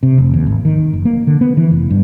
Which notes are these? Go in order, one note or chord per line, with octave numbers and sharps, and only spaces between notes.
C3
F1
D#2
G#1
D#3
F#1
A#3
D3
B3
E3
F1
G2